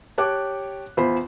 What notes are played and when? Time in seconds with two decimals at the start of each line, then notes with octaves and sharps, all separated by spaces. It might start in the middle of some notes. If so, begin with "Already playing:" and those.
0.18 G4 C#5 A5 D6 F#6
0.97 E2 F4 C5 B5